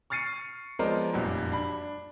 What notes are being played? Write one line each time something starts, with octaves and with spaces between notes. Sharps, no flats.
C#6 F6 A6 C7 C#7 D#7
F3 G#3 B3 A#4 C5 D5
F1 F#2 A#2 G3
D4 B5